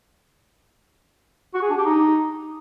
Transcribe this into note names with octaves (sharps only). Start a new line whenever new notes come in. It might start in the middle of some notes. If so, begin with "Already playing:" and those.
F#4
G#4
D4
G4
D#4